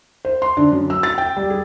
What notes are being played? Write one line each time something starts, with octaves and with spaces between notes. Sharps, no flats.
C5
C6
D3
F#2
E6
A6
G5
G3
G#4